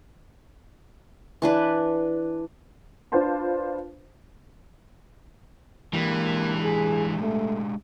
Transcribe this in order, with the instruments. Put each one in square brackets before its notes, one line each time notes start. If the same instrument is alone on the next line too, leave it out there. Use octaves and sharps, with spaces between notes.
[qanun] E3 D4 B4
[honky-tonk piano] D4 F4 B4 C5 A5 C6
[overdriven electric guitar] E3 [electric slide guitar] G#3 D4 G4 [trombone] A#3
[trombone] G#4
A3